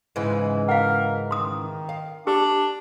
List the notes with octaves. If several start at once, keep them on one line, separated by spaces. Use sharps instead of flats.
G#2 C#3 E3
A#4 F5 F#5
D#3 C6 D#6
F5
D4 G4